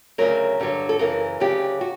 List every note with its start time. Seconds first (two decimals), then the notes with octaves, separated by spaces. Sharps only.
0.18 D2 C#3 F#3 A#4
0.60 G2 D3 F#3
0.89 A4
0.99 F#2 C#3 E3 A#4
1.40 D2 C#3 F#3 G4
1.81 F#4